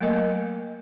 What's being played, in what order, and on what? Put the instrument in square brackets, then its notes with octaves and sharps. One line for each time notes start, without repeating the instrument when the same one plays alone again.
[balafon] F#3 A3 A#3 A#4 D#5